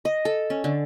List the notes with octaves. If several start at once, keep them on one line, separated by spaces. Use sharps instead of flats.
D#5
A4
C#4
D3